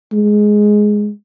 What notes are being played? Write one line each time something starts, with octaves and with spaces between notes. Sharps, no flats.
G#3